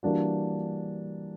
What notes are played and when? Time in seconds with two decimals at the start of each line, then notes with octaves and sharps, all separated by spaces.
0.03 E3 G3 A#3 D4 F#4